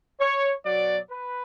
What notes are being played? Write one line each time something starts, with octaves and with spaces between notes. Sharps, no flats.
C#5
B2 F#3 D5
B4